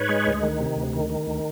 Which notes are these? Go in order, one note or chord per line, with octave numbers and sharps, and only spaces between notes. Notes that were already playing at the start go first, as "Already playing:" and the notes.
Already playing: G#2 B4 C#5
G#3
D2
D#3
C3
D2
D#3
D#3
D2